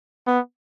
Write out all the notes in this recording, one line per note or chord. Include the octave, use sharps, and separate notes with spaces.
B3